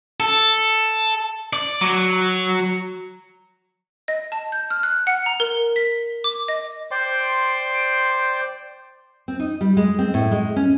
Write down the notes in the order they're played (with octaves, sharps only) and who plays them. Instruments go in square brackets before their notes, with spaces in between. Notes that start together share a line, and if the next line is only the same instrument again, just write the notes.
[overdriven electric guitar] A4
D5
F#3
[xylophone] D#5
A5
G6
F6
F#6
F#5
A#5
A#4
B6
D6
D#5
[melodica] C5 D5 G5 C6
[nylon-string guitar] C4
D#4
G3
G#3
C4
A2
G#3
C#4